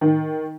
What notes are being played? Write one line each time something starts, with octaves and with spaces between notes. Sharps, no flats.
D#3